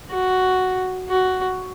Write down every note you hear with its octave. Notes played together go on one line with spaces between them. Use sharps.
F#4
F#4